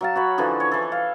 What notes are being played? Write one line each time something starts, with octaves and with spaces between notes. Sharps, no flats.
F#3 F5 A5
F#4 C#5 B5
D3 E3 F3 G#4
C#5
E3 A4
F5